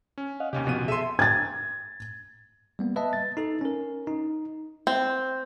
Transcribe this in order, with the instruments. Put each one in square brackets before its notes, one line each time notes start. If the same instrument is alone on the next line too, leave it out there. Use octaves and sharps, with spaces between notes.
[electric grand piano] C#4
[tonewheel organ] D#5 F5 F#5
[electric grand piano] D#2 C#4 G4 [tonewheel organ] C3
[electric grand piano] D#2 F3 D#7 [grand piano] B2
[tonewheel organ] G#4 [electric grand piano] A4 D#7 [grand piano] E5 C6
[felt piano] G#6 A6
[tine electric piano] G3 A#3 B3
B4 D#5 E5 A5
A6
D#4 A4
C#4 A#4
D#4
[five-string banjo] C4